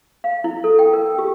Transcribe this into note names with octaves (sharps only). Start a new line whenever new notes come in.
F5
E4
A4
G5
A#4
G4